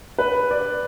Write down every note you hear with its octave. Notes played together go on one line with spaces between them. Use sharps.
B4
D5